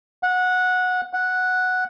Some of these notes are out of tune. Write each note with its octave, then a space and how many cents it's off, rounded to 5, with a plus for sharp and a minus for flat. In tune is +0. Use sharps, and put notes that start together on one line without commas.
F#5 -15
F#5 -5